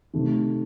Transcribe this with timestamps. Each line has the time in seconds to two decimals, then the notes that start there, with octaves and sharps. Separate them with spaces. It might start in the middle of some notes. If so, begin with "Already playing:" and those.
0.13 C3 D#3 A3